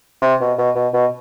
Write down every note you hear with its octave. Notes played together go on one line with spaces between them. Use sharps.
C3
B2
B2
B2
B2